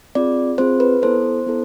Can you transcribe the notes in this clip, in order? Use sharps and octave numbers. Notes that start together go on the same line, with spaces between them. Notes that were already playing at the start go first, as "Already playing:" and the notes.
C4 F4 G#4 D5
C4 F4 G#4 C5
B4
B3 E4 A4 C5
B3 E4 A4